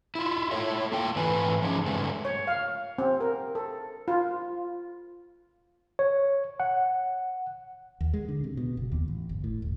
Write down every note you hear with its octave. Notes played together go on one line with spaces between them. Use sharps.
E4 F4
E4 A4 C#5 E5
A#3 F4 G5
G#2 E3 A3 C4 B4 G#5
F3 C#4 D#4 G#4
G2 C#3 G#3 A3
C#5
F5
C4
A#4
A4
F4
C#5
F#5
D#2
G#3
D3
C3
B2
F#1
D#2
A1
G1
A2
D#1